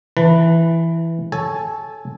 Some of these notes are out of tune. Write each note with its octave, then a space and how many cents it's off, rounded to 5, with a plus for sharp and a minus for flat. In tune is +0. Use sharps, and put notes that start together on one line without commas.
E3 +5 B4 +0 A5 +30
A4 -15 C#5 +0 G#5 +0